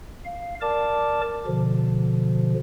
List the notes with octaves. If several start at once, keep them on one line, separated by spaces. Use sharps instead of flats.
F5
A#4 D5 A5 D6
B2 D3 F3